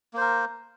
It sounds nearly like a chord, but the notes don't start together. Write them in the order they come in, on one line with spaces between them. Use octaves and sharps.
A#3 C5 A#4